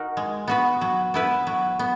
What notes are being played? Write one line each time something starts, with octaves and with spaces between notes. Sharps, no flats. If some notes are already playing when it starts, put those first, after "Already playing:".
Already playing: D#4 F#4 A#4
G#3
B3 F#4 B4
F#3
B3 E4 B4
F#3
B3